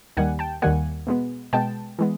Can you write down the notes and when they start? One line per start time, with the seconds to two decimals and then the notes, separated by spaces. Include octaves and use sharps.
0.17 D#2 D#3 G3 A#3 F#5 G#5
0.39 G5 A5
0.62 D#2 D#3 G3 A#3 F#5 G#5
1.07 B2 G#3 B3
1.53 B2 G#3 B3 G5 A5
1.99 E3 G#3 B3